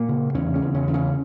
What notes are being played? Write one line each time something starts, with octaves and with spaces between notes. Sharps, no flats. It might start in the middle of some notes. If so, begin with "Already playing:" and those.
Already playing: A#2 A#3
C#3
E2 C#3 C#4
C#3 C#4
E2
C#3 C#4
E2
C#3 C#4